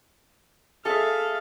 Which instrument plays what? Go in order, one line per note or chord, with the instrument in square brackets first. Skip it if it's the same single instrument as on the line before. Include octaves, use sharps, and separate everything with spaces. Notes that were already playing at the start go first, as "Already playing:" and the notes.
[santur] G#4 E5 [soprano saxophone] A4 [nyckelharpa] F5